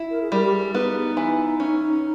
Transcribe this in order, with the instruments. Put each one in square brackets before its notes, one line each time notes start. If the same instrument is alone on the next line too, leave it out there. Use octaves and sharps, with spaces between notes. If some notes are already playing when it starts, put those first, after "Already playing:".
Already playing: [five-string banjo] E4
[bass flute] A#4
G#4
[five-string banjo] G3 [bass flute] A#4
[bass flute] G4
G#4
[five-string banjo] B3 [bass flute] D#4
[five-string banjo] E3
C#4